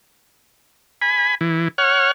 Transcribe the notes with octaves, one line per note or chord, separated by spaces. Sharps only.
G#5 B5
E3
C#5 F#5 F6